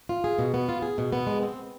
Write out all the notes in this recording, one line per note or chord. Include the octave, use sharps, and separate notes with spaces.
F4
G#4
B2
B3
F4
G#4
B2
B3
G#3
C4